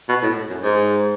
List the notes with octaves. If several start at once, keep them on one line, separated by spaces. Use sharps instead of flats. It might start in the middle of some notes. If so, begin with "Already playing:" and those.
B2
A2
F#2
G#2